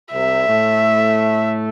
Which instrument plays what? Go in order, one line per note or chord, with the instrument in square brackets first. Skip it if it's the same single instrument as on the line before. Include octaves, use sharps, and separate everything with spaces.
[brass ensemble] C2 C3 [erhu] E5
[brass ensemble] A2 A3